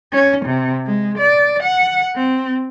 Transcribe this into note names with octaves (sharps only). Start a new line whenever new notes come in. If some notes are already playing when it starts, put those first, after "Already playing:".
C#4
C3
G#3
D5
F#5
C4